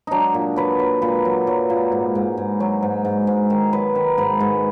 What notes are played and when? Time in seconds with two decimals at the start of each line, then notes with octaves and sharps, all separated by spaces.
0.07 F#3 D4 D#4
0.34 A#2
0.56 F#3 B4
0.79 F#3
1.02 A#2 B4
1.25 F#3
1.47 F#3
1.70 A#2
1.92 G#2
2.15 G#2
2.37 G#2
2.60 F#3
2.83 G#2
3.05 G#2
3.27 G#2
3.50 D#3
3.73 F#3 B4
3.95 D#3
4.18 G#2 B4
4.40 G#2